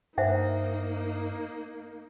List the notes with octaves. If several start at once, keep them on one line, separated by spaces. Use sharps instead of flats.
G2 A#3 D#4 C5 E5 F#5